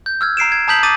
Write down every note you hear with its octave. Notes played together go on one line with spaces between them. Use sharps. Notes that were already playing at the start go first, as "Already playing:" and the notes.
G6
E6 F6 G#6
A#5 C7 D7 E7
G#6
A5 A#5 D#6 G6 B6 F#7
D6 D#6 A6 D#7